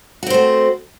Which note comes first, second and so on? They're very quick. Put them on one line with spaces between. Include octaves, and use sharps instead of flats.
F#4 C4 C5 A3